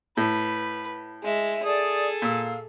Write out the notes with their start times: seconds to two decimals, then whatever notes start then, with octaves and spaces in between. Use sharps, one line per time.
0.17 A2 B4
1.24 G#3 E5
1.63 G#4 A4 D5 D#6
2.22 A#2 F5 E6